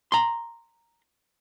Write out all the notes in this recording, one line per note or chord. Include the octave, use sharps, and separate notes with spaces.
A#5 C6